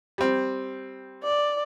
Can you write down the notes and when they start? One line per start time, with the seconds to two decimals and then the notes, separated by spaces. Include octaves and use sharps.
0.18 G3 C4
1.23 D5